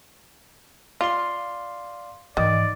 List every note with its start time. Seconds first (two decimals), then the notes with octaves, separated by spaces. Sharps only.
1.01 F4 D5 F5 C6
2.37 G#2 D#3 E3 D5